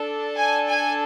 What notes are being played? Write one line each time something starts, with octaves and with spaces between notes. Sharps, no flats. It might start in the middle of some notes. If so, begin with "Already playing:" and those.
Already playing: D4 A4
G#5
G#5